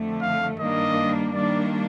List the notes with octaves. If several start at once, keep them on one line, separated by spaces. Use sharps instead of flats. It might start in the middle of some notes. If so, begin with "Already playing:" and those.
Already playing: F2 D3 A3
F5
G2 D#3 G3 A#3 D4 D#5
D#3 G3 A#3 D4 D5